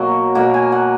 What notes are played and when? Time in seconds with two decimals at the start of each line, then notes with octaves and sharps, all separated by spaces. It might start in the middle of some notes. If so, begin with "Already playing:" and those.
Already playing: B2 F#3 A#3 F5
0.35 B2 A#3 F#5
0.54 G#5
0.72 F#5